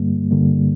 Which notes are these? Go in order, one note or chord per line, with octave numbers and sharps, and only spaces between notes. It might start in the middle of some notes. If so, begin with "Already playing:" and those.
Already playing: G2 D3 G3 A#3
G2 D3 G3 A#3